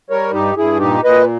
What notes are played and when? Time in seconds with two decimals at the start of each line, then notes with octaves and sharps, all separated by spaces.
0.10 G3 A#4 C#5
0.33 G2 D#4 G4
0.57 G2 E4 G#4
0.80 A#2 D#4 G4
1.04 A#2 B4 D#5